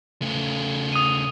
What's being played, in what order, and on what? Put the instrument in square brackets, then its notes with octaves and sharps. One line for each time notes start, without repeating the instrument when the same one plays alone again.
[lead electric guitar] C#3 A3
[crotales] D#6 D#7